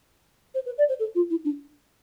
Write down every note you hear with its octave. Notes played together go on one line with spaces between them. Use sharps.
C5
B4
D5
C5
A4
F4
E4
D4